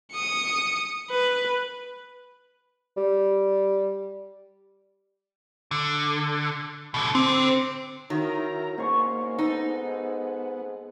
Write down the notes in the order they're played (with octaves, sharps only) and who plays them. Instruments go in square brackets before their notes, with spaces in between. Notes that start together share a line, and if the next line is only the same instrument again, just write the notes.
[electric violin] D#6 C#7
B4
[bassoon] G3
[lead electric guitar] D3
B2 D3
[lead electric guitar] D3 [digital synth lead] C4
[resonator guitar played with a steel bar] D#3 [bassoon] F#3 [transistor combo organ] E4 A#4 A#5
[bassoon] G#2 [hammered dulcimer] B2 C6 C#6 [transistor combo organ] A#3 C#4
[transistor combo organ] B3 [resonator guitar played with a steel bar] D#4 [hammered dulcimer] A4